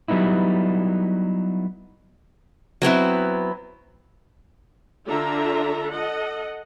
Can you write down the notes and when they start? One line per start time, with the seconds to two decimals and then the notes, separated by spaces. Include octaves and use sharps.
0.08 F#3 G3 B3 D#4 E4
2.82 F#3 B3 C4 E4
5.08 D3 D4 F4 A4 E5 A#5
5.91 A4 D#5 F#5